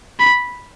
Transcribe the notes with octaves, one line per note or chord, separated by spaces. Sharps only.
B5